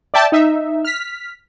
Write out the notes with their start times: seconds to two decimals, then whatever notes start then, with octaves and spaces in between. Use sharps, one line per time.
0.14 D5 E5 G5 A5
0.32 D#4 E5
0.85 F6 B6